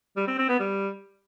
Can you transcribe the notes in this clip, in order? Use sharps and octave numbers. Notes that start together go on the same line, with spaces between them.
G3
C4
C4
B3
G3